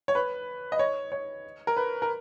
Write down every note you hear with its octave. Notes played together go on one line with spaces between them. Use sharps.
C#5
B4
D#5
C#5
C#5
A#4
B4
A#4